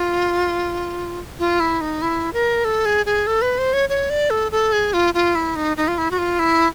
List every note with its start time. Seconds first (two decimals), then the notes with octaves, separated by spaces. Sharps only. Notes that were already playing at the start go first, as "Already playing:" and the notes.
Already playing: F4
1.39 F4
1.60 E4
1.81 D#4
2.02 E4
2.33 A#4
2.65 A4
2.86 G#4
3.06 G#4
3.27 A4
3.42 B4
3.58 C5
3.73 C#5
3.89 C#5
4.10 D5
4.30 A4
4.52 A4
4.73 G#4
4.93 F4
5.14 F4
5.35 E4
5.56 D#4
5.77 D#4
5.88 F4
5.98 E4
6.11 F#4
6.18 F4
6.39 E4